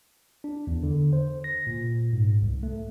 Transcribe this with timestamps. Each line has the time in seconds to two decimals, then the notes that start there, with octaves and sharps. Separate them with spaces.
0.44 D4
0.67 E2
0.83 D3
1.13 C5
1.44 A#6
1.67 A#2
2.13 G#2
2.42 C2
2.63 A3